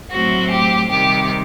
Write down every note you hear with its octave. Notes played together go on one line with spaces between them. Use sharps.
A2 F#3 A3 C4 F#4
G4
C3 D#3 G3 G4